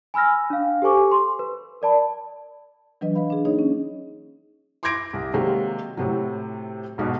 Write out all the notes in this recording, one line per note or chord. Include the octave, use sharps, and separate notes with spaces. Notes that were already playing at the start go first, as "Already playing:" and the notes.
G#5 B5 E6 F6 A#6
D4 F5
G4 A4 C5 G#5 C#6 D6
C6
B4
A#4 D5 A5 B5
E3 F#3 D4 B4 D#5
B4 D#5 F5 B5
D4 G#4
A#3 D#4 G#4 C#5 D#5
C#4
C6 D6 G6 G#6 A#6 D7
C2
C3 D#3 F#3 G#3 A#3
A2 C3 F#3
B1 G#2 B2